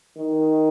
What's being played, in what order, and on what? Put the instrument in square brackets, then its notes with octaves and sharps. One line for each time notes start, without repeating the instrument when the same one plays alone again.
[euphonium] D#3